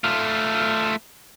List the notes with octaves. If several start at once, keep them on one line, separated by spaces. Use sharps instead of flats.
A3 F4